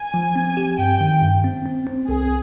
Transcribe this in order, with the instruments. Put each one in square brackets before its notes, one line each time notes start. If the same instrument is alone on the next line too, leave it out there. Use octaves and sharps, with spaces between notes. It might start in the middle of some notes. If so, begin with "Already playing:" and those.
Already playing: [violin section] G#5
[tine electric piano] F3
C4
G4
[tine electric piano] G2 [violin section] G5
[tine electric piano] D#3
G2
C4
C4
C4
[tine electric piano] C2 [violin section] G#4